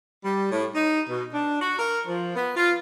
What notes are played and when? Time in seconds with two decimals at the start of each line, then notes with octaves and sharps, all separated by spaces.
0.24 G3
0.51 A2
0.73 D#4
1.09 B2
1.33 D4
1.61 F#4
1.79 A#4
2.08 F3
2.35 B3
2.56 F4